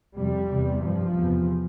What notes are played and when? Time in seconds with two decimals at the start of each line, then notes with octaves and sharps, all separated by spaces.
0.16 F2 C3 G3
0.50 E2 C3
0.83 G2 F3
1.17 E2 C3